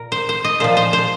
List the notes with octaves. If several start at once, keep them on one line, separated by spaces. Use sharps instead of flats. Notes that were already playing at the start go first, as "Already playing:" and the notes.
Already playing: A#2 A#4
C5
C5
D#5
A#2 F3 C5
C5
C5